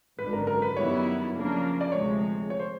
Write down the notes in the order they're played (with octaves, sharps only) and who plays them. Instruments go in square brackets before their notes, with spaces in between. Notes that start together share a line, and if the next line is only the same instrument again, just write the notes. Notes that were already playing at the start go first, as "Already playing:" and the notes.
[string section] G#1 F#2 D3 [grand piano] B4
[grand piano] A#4
A#4
B4
[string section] F#2 D#3 G3 B3 E4 [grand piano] C#5
[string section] C#3 F3 A#3 D4
[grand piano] D5
[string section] D2 C3 F3 G#3 [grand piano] C#5
[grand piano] C#5
C5